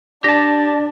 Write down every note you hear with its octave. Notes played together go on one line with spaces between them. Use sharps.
D4 G4 D5 A5 A#6